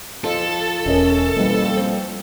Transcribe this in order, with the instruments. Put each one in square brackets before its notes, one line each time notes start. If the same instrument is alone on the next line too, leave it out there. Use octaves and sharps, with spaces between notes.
[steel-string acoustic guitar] F2 F4 [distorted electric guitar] A4
[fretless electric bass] E1 [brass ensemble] C#4 [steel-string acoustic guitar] A#4 D#5 E5
[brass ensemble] F2 [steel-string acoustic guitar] E3 [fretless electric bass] G3 A#3
[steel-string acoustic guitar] C4